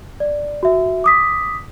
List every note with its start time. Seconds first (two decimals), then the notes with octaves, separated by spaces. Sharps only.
0.20 D5
0.63 F#4 E5
1.04 D6 D#6 B6